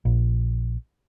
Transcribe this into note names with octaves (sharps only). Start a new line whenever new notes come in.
A#1